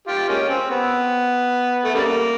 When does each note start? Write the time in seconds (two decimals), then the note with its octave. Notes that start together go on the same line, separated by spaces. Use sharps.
0.07 F4 G4
0.29 G#3 A#3 C#4
0.50 C4
0.70 B3
1.85 A3
1.95 C#3 G3 A#3